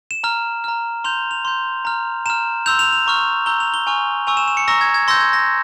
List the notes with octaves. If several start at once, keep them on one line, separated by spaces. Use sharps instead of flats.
E7
A#5 F6
A#5 F6
C6 G6 F7
F7
C6 G6
A#5 F6
A#5 F6 E7
C6 E6 G6 F7
F7
F7
A#5 C#6 F6
A#5 E6 G6 G7
F7
G7
G#5 C#6 F6 F7
G#5 C#6 E6 F7
E7
E7
C#7
A#5 C#6 E6 A#6
G#6
G#6
C6 E6 G6 A#6
G#6
A#6